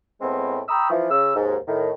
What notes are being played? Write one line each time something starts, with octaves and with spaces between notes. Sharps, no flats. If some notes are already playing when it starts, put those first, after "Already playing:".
A2 G#3 B3 C4
G5 A#5 B5 C#6 D#6 E6
E3 F3
C#3 E6
D#2 G#2
A2 D#3